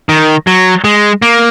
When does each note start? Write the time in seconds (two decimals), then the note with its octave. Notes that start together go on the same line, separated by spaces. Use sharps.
0.09 D#3
0.47 F#3
0.84 G#3
1.22 A#3